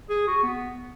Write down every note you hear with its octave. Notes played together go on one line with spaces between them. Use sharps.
G#4
F#4
B3